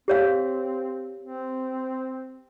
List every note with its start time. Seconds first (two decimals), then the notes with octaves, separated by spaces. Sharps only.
0.08 C4 G4 C#5 F5
1.21 C4